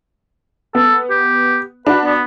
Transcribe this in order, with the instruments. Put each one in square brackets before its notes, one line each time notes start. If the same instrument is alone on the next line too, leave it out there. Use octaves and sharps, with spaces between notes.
[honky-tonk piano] B3 [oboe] A4
[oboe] G4
[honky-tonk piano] D4 F#4 [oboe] B4
[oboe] B3